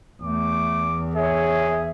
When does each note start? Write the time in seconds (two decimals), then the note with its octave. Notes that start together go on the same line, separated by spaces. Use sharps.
0.22 E2 A3 D6
1.15 G#4 C#5 E5